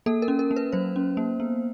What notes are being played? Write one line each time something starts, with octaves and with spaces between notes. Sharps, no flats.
A#3 A4
A#4
C#4
A#4
A#3
B4
F#3 C5
C#4
A#3
B3